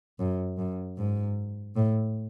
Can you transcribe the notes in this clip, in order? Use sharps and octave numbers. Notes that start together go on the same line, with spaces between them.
F#2
F#2
G#2
A2